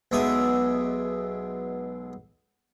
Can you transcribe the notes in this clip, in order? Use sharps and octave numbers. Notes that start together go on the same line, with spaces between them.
B1 B2 G#3 E5 D6 D#6